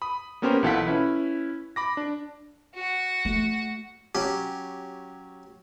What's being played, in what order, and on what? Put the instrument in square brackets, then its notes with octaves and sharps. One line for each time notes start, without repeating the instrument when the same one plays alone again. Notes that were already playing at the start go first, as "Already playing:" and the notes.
[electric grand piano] B5 D#6
A#3 B3 C#4 G4 A#4 C5
B1 E3 F4 A4 F#5 B6
C#4 E4 B4
B5 D6 A#6
D4
[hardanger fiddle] F#4 F#5
[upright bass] A3
[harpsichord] F#3 C#4 G4